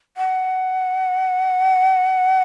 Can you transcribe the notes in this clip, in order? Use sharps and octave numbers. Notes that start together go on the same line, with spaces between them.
F#5